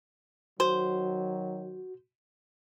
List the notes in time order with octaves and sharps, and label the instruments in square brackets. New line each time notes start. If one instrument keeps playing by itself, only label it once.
[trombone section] D#3 F#3 [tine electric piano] F#4 [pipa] C5